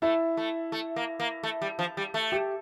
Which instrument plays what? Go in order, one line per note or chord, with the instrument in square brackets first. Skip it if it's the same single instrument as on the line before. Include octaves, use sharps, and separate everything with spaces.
[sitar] A3 [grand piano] E4
[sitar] A3
A3
A#3
A#3
A3
G3
F3
G3
A3
[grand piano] G4